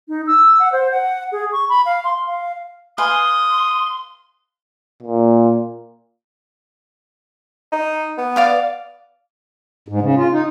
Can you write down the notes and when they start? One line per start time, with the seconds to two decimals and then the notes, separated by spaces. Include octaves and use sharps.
0.08 D#4
0.27 E6
0.59 F#5
0.72 C5
0.91 F#5
1.32 G#4
1.52 C#6
1.69 B5
1.86 F5
2.04 C6
2.27 F5
2.98 B4 F5 G#5 C6 D#6
5.03 A#2
7.72 D#4
8.18 B3
8.36 D5 F5 D6
9.88 G#2
10.02 C#3
10.16 F4
10.32 D#4